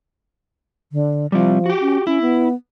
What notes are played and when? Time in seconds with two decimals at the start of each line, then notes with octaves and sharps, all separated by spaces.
0.92 D3
1.32 F3 G3 C4
1.66 F#4 G4
1.82 C#4
2.07 C#4 E4
2.22 B3